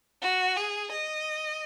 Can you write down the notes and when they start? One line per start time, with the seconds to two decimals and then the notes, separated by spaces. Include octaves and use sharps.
0.22 F#4
0.56 G#4
0.92 D#5